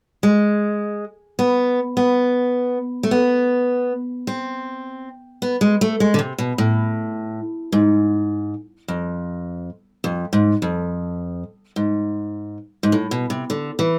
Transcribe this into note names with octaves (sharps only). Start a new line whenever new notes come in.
G#3
B3
B3
A3
B3
C4
B3
G#3
A3
G#3
D3
C3
B2
A2
G#2
F2
F2
G#2
F2
G#2
G#2
A2
B2
C3
D3
E3